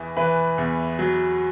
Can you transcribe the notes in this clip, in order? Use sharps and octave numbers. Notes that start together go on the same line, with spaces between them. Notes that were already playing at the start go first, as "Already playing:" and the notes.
Already playing: E2 E3
E3 B4
E2
F#3